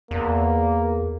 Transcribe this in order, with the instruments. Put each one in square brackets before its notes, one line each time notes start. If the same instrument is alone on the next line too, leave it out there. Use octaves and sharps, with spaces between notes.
[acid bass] E2 [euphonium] A#3